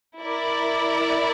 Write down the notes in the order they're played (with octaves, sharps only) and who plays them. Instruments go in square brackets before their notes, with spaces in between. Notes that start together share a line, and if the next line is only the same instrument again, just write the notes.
[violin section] E4 A#4 D5